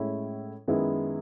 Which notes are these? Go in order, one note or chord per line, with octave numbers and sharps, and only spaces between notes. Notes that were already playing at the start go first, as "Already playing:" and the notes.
Already playing: A2 G#3 C#4 E4
F#2 D#3 G#3 B3 E4